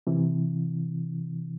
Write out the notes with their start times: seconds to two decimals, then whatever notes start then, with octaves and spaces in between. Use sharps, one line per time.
0.07 C3 E3